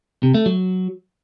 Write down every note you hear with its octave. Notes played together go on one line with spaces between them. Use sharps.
C3
A3
F#3